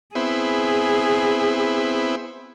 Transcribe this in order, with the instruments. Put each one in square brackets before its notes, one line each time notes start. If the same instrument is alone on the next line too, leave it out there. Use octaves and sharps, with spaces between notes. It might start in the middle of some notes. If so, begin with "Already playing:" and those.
[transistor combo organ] B3 C4 E4 [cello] G#4